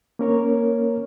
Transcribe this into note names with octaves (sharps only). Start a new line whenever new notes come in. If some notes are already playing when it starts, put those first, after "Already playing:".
A#3 C#4 A#4 C#5